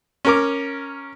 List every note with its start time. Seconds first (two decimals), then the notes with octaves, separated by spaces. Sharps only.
0.25 C#4 A#4 D6